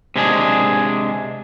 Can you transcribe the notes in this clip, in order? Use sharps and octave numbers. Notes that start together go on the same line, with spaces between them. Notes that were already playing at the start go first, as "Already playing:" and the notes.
C3 G#3 D4 G#4